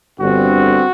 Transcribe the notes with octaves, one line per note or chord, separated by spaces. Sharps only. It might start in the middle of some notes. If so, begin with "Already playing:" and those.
G1 G2 D3 G3 C4 F#4